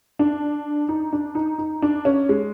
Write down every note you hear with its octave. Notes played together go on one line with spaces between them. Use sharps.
D4
D#4
D4
D#4
D#4
D4
C#4
G#3